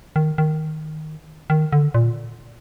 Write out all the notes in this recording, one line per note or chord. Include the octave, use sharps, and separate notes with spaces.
D#3
D#3
D#3
D3
A#2